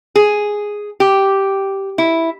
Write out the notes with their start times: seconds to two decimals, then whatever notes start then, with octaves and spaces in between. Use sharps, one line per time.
0.16 G#4
1.00 G4
1.98 E4